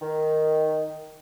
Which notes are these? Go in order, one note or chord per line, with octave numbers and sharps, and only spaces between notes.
D#3